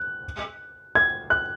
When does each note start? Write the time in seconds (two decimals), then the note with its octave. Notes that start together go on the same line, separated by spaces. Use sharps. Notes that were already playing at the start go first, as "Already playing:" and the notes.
Already playing: F#6
0.95 G#6
1.30 F#6